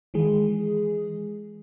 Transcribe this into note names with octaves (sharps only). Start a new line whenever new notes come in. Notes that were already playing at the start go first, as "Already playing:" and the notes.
D#3 E3 G#3 G#4